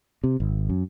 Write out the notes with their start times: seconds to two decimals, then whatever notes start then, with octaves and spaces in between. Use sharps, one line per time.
0.24 C3
0.40 G#1
0.69 F#2